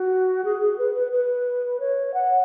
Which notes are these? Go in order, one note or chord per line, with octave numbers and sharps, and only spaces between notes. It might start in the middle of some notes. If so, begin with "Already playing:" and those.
Already playing: F#4
G#4
G#4
B4
B4
B4
C#5
F#5